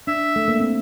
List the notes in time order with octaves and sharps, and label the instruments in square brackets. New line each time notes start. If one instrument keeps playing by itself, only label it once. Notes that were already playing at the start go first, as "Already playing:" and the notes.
[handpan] D4 [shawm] E5
[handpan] A3
A#3
C4